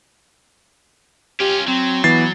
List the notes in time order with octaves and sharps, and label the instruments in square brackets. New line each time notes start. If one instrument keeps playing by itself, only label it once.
[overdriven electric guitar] C#4 F4 [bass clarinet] G4
[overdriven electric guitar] F#3 [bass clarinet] C4
[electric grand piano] E3 A6 C7 [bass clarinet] B3